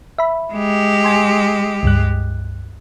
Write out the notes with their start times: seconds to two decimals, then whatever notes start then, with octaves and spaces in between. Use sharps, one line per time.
0.18 E5 B5
0.53 G#3 G4
1.04 G#5 C6
1.83 C#2 G2 F#6